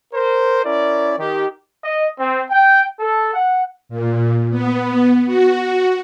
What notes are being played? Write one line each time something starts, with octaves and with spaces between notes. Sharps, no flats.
A#4 C5
C#4 E4 A#4 D5
D#3 G4
D#5
C4
G5
A4
F#5
A#2
B3
F#4